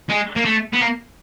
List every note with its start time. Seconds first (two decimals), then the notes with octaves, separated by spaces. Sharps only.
0.09 G#3
0.36 A#3
0.45 A3
0.73 B3
0.81 A#3